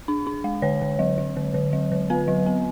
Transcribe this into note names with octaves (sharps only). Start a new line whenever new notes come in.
D4
D4
G#3
D3 C#5
D3
F#3
F#3
D3
D3
F#3
D3
B3 B4
F#3
B3